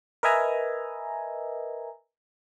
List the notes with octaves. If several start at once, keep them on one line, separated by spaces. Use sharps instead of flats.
A#4 B4 D#5 E5 G#5 A#5